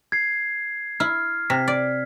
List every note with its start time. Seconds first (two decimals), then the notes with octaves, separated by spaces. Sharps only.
0.12 G#6 C7
1.00 E4 F6
1.50 C3 B6
1.68 D5